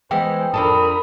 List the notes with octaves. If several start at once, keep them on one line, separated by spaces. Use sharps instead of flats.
E3 G#3 B3 C5 G5
F2 D4 A4 A#4 B5 D#6